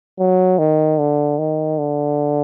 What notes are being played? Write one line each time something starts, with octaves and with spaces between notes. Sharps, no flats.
F#3
D#3
D3
D#3
D3